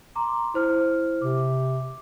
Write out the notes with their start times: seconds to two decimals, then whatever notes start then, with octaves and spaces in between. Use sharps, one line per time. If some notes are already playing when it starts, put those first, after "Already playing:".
0.16 A#5 C6 D6
0.54 E4 C5 F6
1.22 C3 D6